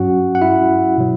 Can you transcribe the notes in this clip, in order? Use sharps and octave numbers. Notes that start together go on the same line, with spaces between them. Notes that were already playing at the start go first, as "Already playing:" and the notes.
Already playing: G2 F#3 C#4 F#4 F#5
F#5
E4 E5
B2 F#3